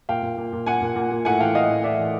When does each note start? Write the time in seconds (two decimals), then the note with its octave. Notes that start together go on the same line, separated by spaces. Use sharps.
0.09 A#2 F5 G5
0.23 A#2
0.38 A#2
0.53 A#2
0.66 A#2 F#5 G#5
0.82 A#2
0.96 A#2
1.11 A#2
1.25 A2 F#5 G#5
1.40 E3 F5 G5
1.54 A2 D#5 F5
1.70 E3
1.84 A2 D5 E5
1.99 E3